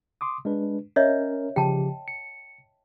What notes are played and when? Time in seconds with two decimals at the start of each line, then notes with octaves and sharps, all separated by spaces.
0.21 C6 D6 D#6
0.45 G#3 D4 B4
0.96 C#4 A#4 C#5 D#5 E5
1.56 C#3 F3 G4 G5 A5
2.08 C#7